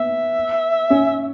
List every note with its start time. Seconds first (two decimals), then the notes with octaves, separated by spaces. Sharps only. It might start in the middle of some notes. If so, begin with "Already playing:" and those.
Already playing: B3 E5
0.90 C#4